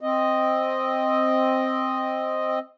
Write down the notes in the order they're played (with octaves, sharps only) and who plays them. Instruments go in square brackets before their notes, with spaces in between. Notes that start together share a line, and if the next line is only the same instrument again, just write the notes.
[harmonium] C4 D#5